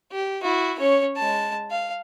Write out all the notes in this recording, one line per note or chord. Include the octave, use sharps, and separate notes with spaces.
G4
E4 F#4
C#4 C#5
G#3 A5
F5